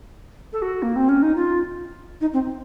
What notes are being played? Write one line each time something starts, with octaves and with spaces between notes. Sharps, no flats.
A4
F#4
A#3
C4
C#4
D#4
F4
D#4
C4